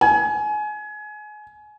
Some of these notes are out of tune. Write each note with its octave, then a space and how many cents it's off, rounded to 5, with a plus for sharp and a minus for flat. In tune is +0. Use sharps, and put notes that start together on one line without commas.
G#5 +25